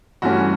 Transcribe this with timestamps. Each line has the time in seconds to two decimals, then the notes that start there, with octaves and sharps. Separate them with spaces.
0.22 G2 E3 A3 C#4 F#4